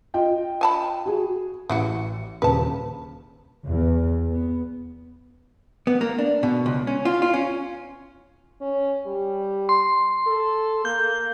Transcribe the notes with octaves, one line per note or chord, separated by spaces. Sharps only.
F4 D#5 G5
G#5 A5 B5
F#4 G#4
A1 E3 E4 F#4 C#7
D#1 C#3 A#3 B4 A5
E2
B3
B3
A#3
D4
B2
C#2
C#4
F4
F4
C#4
C#4
G3
C6
A4
A#3 G6